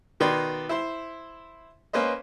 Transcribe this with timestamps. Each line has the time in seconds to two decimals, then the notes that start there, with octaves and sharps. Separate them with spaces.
0.20 B2 D#3 B4 D5 C6
0.69 E4 C5 C6
1.93 A#3 C#4 B4 C5 D#5